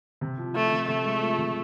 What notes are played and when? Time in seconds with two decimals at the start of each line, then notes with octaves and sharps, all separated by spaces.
0.21 C3
0.38 F3
0.55 F3 A3
0.71 C3
0.88 C3 A3
1.05 G#3
1.21 F3
1.38 C3